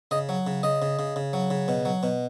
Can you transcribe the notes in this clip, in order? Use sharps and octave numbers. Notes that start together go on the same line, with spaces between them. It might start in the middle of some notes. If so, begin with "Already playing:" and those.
C#3 D#5
F#3
C#3
C#3 D#5
C#3
C#3
C#3
F#3
C#3
B2
F#3
B2